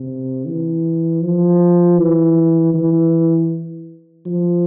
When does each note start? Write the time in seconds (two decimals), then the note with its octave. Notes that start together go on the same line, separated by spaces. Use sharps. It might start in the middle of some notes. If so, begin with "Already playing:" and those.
Already playing: C3
0.47 E3
1.22 F3
1.98 E3
2.74 E3
4.26 F3